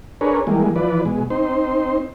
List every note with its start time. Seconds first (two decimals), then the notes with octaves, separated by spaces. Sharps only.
0.21 D4 G#4 A#4 B4 C#5
0.47 E3 G3 G#3 A#3
0.76 E3 F3 B4 D5
1.05 B2 G#3
1.30 C4 D#4 C5